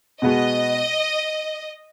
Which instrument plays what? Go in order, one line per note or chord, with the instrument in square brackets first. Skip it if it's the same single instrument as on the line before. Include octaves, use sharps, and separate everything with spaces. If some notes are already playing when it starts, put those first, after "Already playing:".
[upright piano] B2 G#3 B3 F#4 [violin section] D#5